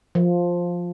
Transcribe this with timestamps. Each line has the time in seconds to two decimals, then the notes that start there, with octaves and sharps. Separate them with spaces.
0.15 F3